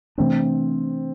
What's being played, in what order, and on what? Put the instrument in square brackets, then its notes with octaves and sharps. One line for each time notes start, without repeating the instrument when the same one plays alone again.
[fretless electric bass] C3 E3 A3 D4 [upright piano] C4